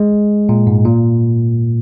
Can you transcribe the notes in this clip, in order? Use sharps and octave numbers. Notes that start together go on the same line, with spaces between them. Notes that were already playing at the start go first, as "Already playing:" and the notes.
Already playing: G#3
A#2
G#2
A#2